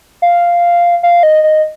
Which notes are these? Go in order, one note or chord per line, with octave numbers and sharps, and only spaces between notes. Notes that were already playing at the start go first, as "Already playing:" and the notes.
F5
F5
D#5
D#5